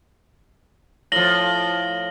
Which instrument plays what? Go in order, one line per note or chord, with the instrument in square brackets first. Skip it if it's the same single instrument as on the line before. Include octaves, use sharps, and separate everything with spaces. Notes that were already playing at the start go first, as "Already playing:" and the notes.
[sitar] A2 F3 [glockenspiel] A#6 F#7 G7